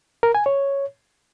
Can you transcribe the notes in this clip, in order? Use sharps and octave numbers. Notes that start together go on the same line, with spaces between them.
A#4
G#5
C#5